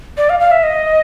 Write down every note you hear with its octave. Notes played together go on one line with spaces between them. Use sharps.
D5
F5
F5
E5
D#5